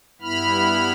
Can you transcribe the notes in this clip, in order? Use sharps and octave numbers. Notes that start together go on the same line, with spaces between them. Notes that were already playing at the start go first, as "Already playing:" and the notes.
G2 B3 E4 B5 F6